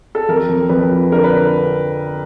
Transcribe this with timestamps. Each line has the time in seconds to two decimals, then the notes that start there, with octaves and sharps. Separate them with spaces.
0.15 A4
0.28 F2 A#4
0.49 F2
0.69 F2 B4
0.91 F3
1.12 D3 A#4
1.24 B4
1.32 D3